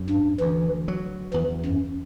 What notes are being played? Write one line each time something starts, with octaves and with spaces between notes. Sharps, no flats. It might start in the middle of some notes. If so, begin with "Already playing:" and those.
Already playing: F#2
G2
D2 E3
F#3
E2 E3
F#2